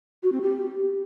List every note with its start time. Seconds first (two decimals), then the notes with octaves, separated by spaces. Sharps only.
0.23 F#4
0.32 C4
0.42 G4